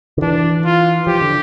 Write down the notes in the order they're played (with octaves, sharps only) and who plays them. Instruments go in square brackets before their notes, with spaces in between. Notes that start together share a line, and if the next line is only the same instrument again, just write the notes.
[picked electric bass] D3
[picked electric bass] E3 [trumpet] D4
[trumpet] F4
[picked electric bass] F3 [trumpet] G4
[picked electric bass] D3